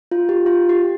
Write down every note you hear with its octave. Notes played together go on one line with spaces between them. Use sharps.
F4
G4
F4
G4